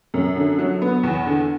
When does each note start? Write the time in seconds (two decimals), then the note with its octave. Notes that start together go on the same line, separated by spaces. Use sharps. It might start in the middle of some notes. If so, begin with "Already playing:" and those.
0.14 F#2
0.36 D3
0.59 F#3
0.82 B3
1.03 E2
1.27 D3